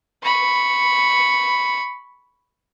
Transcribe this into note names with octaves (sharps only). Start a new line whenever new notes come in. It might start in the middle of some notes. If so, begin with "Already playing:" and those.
B5 C#6